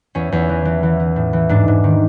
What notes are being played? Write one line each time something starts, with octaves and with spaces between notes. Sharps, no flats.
E2 C#4
E2
E3
E3
E3
E3
A2
E3
G#2 D4
G#2
D#3